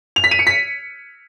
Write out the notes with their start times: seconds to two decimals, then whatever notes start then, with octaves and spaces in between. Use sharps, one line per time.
0.16 F7
0.24 B6
0.31 D#7
0.39 C#7
0.47 B6